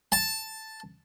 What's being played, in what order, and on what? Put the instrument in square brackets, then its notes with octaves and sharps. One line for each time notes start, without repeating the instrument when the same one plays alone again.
[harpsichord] A5